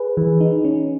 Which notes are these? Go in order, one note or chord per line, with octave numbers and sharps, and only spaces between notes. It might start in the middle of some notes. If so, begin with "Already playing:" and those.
Already playing: G#4 B4
E3
D#4
C#4